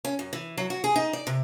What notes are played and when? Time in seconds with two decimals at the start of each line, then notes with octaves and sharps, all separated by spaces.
0.05 C#4
0.19 F#2
0.33 E3
0.57 F#3
0.70 F#4
0.84 G#4
0.96 D#4
1.13 D5
1.27 C3